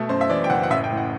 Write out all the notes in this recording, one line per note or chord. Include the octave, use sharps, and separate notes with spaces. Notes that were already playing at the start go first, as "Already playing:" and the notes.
Already playing: B2 A3
F#2 C5
E5
E3 D5
G5
F#1 F#5
F#5
A1 E5
G5
A2
F#5